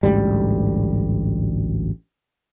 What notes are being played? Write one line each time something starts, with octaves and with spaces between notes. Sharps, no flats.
A1 D2 G#2 G3